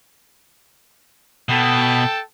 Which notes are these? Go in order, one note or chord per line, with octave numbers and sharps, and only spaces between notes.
B2 A4 G5 A5